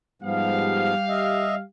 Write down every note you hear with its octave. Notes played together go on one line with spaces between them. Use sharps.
G#2 F3 G3 B3 G4 F5
D#5 E5